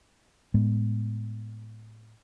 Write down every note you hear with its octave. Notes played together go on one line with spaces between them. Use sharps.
A2 G#3 B3